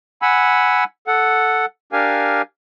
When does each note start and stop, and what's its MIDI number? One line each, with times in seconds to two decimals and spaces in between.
0.22 0.84 78
0.22 0.84 80
0.22 0.84 83
0.22 0.84 88
1.07 1.66 69
1.07 1.66 78
1.93 2.42 62
1.93 2.42 67
1.93 2.42 70
1.93 2.42 77
1.93 2.42 80